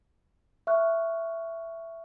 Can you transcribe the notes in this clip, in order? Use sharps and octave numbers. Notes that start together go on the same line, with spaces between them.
E5 C#6 F6 F#6